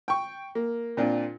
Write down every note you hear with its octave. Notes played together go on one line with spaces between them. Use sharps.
G5 C#6
A#3
A#2 C4 D4 F4